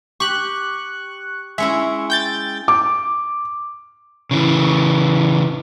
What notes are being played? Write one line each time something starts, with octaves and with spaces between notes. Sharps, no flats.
G4 C#6 F#6
G#3 C#4 E4 E5 C#6
G5 G6 A6
D6
C#3 E3